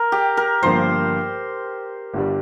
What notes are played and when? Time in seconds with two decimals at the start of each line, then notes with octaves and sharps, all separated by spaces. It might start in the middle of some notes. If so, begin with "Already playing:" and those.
Already playing: A#4
0.12 G4
0.37 A#4
0.62 G1 G2 F3 A#3 C5
2.14 G1 G2 G3